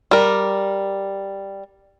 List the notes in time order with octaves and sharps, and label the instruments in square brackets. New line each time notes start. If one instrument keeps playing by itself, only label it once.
[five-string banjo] G3 A#4